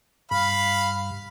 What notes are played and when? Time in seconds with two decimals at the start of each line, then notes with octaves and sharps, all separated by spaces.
0.31 G2 F5 B5